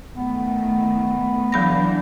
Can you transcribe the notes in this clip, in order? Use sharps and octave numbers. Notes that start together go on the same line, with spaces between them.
D#3 A3 B3
D3 E3 F#3 D4 B5 A#6